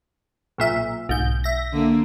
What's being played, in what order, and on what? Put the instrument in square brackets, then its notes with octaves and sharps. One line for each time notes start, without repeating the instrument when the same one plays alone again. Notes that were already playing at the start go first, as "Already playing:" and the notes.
[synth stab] B1 A#2 E5
[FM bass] B1 [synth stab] G#2 G6
[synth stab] E5 A#6
[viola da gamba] D3 A#3